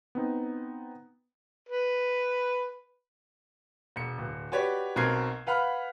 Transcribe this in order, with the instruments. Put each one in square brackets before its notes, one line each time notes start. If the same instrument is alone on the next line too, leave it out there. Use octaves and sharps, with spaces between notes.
[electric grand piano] B3 C4 D#4
[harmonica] B4
[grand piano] E1 C#7
D1
F#4 G4 B4 C#5 D5
B1 B2 C4 A#4 G#6 C7
B4 F5 F#5 B5 F6